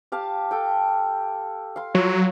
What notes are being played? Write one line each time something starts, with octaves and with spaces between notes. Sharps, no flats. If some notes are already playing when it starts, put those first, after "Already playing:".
G4 F5 A5
A4 G5
F5 C6
F#3 F4 C#5